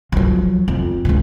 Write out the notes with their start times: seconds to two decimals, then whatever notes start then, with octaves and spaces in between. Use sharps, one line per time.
0.12 F3 F#3
0.68 F2
1.05 C#2 D3